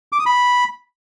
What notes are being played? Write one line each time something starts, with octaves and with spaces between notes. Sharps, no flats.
D6
D#6
B5